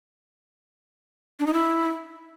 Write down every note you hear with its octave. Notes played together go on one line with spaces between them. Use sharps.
D4
D#4
E4